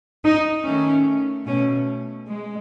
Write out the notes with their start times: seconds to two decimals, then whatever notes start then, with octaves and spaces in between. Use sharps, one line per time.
0.25 D#4
0.65 D#3 A3 C#4
1.47 B2 A3 C#4
2.29 G#3